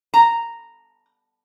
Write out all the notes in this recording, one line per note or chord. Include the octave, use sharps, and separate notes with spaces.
A#5